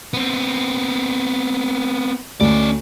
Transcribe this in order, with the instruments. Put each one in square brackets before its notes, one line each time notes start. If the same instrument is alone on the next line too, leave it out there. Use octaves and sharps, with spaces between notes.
[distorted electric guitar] B3 C4
[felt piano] D2 [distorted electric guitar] C#4 D5